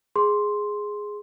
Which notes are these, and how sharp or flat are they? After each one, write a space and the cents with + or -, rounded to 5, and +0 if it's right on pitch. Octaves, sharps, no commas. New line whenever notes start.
G#4 +0 C6 +0